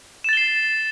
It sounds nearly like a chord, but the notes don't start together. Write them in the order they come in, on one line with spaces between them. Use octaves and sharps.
E7 A6 G7 C7